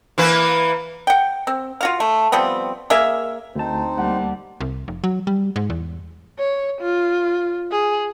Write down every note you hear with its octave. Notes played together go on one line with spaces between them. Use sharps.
E3 A#3 B4
F#5 G5
C4
F4 F#4 F5
A3
F3 G3 B3 C4
A#3 G#4 E5 F5
D2 C4 D#4 C5 A5
G3 A#3 F#5
C2
F1
F#3
G3
G#2
E2
C#5
F4
G#4